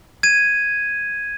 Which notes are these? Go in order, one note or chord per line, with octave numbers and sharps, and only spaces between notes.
G#6 D#7